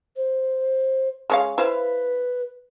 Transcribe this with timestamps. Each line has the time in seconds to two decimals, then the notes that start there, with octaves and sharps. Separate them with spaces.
0.16 C5
1.30 G#3 C#4 F5
1.58 E4 B4 C5 F5